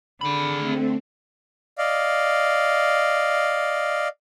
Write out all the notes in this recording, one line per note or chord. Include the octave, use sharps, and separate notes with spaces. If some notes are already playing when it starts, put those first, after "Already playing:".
D3 G#4 B5
A3 C4
D5 D#5 F5